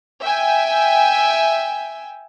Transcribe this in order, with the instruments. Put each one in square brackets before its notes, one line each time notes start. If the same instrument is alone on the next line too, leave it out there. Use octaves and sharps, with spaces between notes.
[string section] E5 G5 G#5